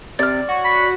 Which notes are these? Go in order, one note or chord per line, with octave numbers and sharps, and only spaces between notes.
C3 D5 F6
F#4 C#5
B5